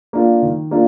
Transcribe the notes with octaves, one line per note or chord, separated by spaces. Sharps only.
A#3 D4 F4
D#3
A#3 D4 F4